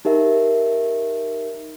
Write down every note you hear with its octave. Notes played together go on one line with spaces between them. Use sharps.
D#4 G4 A#4 E5